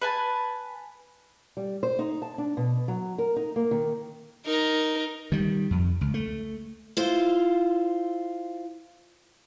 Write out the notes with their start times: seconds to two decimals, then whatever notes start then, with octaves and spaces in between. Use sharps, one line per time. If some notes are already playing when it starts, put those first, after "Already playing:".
0.01 B4 G#5 A5
1.57 G3
1.83 C5
1.99 D#4
2.22 A5
2.38 D4
2.57 B2
2.88 F#3
3.18 A#4
3.36 D#4
3.56 A#3
3.71 D#3
4.46 D#4 A#4
5.32 D#3 G3
5.71 F2
6.01 C#2
6.14 A3
6.97 E4 F4 C5